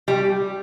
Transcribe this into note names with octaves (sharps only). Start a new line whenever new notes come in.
G3